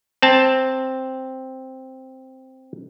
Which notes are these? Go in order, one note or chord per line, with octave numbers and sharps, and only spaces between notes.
C4 A5